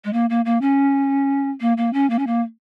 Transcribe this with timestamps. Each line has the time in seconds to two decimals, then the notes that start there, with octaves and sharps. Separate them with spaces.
0.04 G#3
0.13 A#3
0.30 A#3
0.45 A#3
0.61 C#4
1.61 A#3
1.77 A#3
1.93 C#4
2.10 A#3
2.19 C#4
2.27 A#3